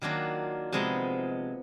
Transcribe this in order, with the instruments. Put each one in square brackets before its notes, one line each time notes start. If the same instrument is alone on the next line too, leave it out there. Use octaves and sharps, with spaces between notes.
[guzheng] D#3 F#3 A#3 D4 F4
C3 F3 G#3 B3 D#4